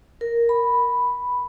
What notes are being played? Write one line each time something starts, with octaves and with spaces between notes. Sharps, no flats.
A#4
B5